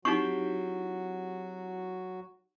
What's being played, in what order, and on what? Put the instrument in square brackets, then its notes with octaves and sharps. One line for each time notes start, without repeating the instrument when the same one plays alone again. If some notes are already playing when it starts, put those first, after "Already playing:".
[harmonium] F#3 F#4 [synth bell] C4 E4 G4 [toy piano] D#4 C#6